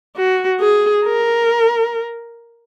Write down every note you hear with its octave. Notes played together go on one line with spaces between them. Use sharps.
F#4
G#4
A#4